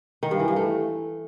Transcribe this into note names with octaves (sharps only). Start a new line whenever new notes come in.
D#3
G2
E3
G2
A3